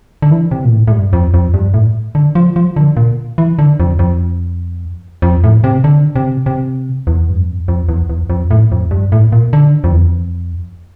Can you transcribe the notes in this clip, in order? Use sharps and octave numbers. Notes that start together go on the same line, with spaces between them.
D3
E3
C3
A#2
A2
A2
G2
F2
F2
G2
A2
D3
F3
F3
D3
A#2
E3
D3
F2
F2
F2
A2
C3
D3
C3
C3
E2
G2
F2
F2
E2
E2
F2
A2
F2
G2
A2
A#2
D3
F2
E2
F2